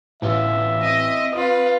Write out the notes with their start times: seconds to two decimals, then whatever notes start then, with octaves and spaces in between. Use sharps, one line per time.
0.22 A1 E3 B3 F4 E5
0.83 C4 D#5
1.33 F4 B4 D#6